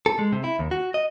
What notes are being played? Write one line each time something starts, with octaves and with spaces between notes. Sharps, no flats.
A4
G#3
C3
E4
D#2
F#4
D#5